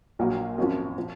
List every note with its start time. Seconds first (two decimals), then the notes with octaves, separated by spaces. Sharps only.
0.19 A#1 A#2 F#3 A#3
0.58 G#1 F#2 F3
0.98 F3